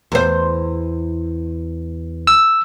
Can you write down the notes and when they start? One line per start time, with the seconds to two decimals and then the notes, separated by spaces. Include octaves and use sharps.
0.12 E2 C5
2.27 E6